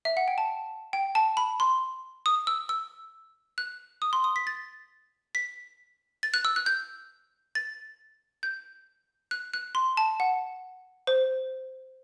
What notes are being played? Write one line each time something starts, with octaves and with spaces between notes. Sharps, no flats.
E5
F#5
G5
A5
G5
A5
B5
C6
D#6
E6
E6
F#6
D#6
C6
D#6
B6
A6
B6
A6
F#6
E6
F#6
G6
A6
G6
F#6
F#6
C6
A5
F#5
C5